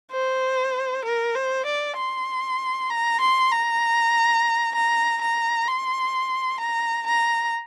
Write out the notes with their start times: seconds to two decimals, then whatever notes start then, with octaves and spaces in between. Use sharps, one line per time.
0.12 C5
1.05 A#4
1.35 C5
1.66 D5
1.97 C6
2.90 A#5
3.21 C6
3.52 A#5
4.75 A#5
5.22 A#5
5.68 C6
6.61 A#5
7.07 A#5